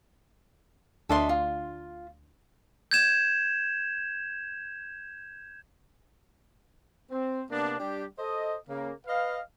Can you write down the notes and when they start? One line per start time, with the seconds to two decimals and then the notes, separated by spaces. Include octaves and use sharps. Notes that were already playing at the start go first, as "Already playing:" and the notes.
1.09 D2 D4 A4 D#5 E5 C6
1.29 F4
2.91 G6 G#6 E7
7.11 C4
7.51 C3 A#3 B3 D4
7.80 G3 D4 G4
8.19 A4 C5 D#5
8.69 C#3 A#3
9.07 B4 D#5 F5